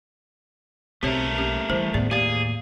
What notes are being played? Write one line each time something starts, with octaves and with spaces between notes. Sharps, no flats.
B1 A3 C4 G4 A#4 C#5 E5
A#3 C#4 G4
E3 G3 E4 C5
D#2 A2 B3 G#4 D5
A#3 G4 G#4 A#4 D5 F5